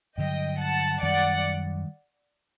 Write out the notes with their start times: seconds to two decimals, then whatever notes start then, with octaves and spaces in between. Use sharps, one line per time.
0.17 G2 D3 F#3 D#5 G5
0.60 F#5 A5
1.02 F#2 D#3 G3 D5 F#5